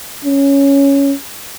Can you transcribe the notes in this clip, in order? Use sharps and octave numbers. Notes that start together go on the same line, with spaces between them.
C#4